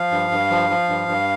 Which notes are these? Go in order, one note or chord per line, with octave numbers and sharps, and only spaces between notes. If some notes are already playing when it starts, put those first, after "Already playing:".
Already playing: F3 F5
G2
G2
F3
F3
G2
G2